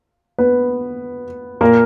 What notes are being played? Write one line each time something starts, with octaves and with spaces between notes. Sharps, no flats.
B3 B4
A#2 A#3 A#4